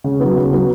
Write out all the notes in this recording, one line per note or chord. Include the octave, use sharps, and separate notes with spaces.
C#3
F#3 B3
C#3
F#3 B3